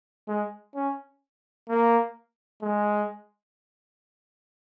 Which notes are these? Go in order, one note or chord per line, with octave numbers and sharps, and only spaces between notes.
G#3
C#4
A#3
G#3